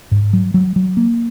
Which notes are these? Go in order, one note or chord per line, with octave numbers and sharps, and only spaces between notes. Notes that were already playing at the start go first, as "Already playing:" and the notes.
G#2
F#3
F#3
F#3
A#3